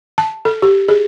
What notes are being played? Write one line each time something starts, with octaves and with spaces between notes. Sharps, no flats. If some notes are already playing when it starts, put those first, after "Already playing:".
A5
A4
G4
G#4